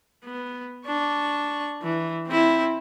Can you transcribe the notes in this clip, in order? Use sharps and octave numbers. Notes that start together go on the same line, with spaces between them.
B3
D4 C#6
E3
C4 E4